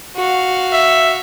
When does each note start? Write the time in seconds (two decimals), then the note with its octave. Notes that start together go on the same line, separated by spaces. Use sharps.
0.16 F#4 F5
0.73 E5